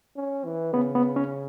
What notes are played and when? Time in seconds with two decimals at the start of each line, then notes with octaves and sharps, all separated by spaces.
0.17 C#4
0.45 E3
0.73 C#3 B3
0.95 B3
1.16 C#4